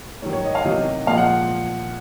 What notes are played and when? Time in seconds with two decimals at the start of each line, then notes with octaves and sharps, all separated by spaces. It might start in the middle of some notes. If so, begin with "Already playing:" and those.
0.22 G#2 D#3 F#3 C#5
0.33 C#5
0.44 D#5
0.55 F5
0.64 C3 D#3 F#3 D#5
1.06 A#2 F3 G#3 F5
1.18 F#5